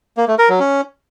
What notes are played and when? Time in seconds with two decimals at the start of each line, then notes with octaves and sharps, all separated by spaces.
0.17 A#3
0.28 A3
0.38 A#4
0.49 F#3
0.60 C#4